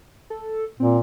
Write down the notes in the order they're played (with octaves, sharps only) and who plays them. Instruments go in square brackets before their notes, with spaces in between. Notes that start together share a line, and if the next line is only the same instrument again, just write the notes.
[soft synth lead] A4
[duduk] A#2 [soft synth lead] C4